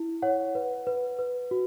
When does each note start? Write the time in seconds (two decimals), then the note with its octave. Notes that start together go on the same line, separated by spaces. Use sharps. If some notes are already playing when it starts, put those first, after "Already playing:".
Already playing: E4
0.22 C#5 F#5
0.55 B4
0.87 B4
1.19 B4
1.51 F#4